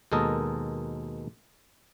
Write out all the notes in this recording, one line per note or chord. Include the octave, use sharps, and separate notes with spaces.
D#2 B2 G#3 A4 A#4 D#5